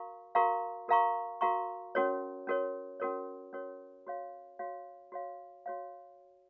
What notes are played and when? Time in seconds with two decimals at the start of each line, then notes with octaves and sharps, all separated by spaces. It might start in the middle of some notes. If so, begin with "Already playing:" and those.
Already playing: F#4 A#4 F5 A#5 C#6
0.35 F#4 A#4 F5 A#5 C#6
0.88 F#4 A#4 F5 A#5 C#6
1.41 F#4 A#4 F5 A#5 C#6
1.95 C#4 F#4 A#4 C#5
2.47 C#4 F#4 A#4 C#5
3.00 C#4 F#4 A#4 C#5
3.53 C#4 F#4 A#4 C#5
4.07 F#4 C#5 F5
4.59 F#4 C#5 F5
5.12 F#4 C#5 F5
5.66 F#4 C#5 F5